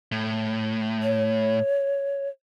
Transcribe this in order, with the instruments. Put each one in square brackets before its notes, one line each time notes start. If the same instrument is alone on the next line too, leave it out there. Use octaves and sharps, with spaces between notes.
[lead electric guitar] A2
[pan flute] C#5